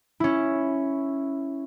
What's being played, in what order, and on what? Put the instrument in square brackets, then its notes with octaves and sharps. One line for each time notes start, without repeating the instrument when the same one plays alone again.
[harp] C#4 E4